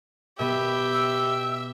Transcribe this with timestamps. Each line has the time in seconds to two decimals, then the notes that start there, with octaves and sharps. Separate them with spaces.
0.39 B2 B3 G4 E5
0.93 E6